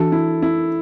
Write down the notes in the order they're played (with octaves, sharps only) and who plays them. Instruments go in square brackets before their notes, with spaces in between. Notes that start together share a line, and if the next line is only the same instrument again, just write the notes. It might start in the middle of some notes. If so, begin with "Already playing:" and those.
Already playing: [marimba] E3 D4 F#4 [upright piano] A4
[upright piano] E4
E4